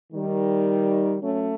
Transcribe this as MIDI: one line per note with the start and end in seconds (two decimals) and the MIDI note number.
0.13 1.15 51
0.13 1.15 55
1.22 1.55 54
1.22 1.55 57
1.22 1.55 61